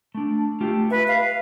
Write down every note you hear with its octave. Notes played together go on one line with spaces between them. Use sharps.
A3 D4
A3 F4 G4
B4 E5
F5